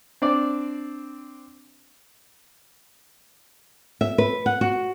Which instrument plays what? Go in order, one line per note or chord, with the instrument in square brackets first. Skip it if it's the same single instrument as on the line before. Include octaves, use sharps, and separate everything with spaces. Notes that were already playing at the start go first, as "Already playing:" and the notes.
[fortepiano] C4 D4 D5
[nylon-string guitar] E5
B4
F#5
F#4